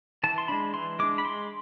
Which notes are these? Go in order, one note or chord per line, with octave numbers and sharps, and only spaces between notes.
E3 A5
C6
G#3 D4 B5
E3 C6
G#3 D4 D6
B5
G#3 C6